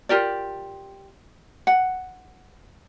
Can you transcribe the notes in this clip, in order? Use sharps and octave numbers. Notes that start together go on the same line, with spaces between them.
F4 G4 A#4 D5
F#5